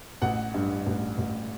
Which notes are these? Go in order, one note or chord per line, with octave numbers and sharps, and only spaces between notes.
A1 F#5
G2
A1
A1